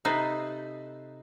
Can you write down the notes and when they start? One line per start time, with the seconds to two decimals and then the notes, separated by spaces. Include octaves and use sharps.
0.05 C3 D#4 A4 B4 C5